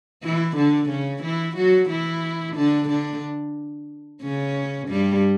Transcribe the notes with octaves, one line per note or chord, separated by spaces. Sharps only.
E3 E4
D3 D4
C#3 C#4
E3 E4
F#3 F#4
E3 E4
D3 D4
D3 D4
C#3 C#4
G2 G3